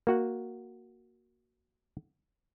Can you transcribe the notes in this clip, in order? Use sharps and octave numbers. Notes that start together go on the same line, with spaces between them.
A#3 F#4 F#5